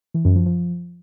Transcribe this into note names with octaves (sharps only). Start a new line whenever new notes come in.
E3
F#2
F3
F3